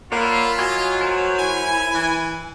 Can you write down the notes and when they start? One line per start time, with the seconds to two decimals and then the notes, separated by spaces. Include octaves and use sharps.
0.12 A#3 F4 C#5 D5 F#5 B5 E6
0.59 F#3 C#5 D#5 G#5
1.01 A#4 C5 C#5
1.38 E4 G#5
1.94 E3